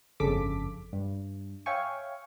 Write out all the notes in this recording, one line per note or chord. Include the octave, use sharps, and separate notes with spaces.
G1 F2 C#3 A4 D6 B6
G2
C#5 E5 F5 G5 G#5 C#6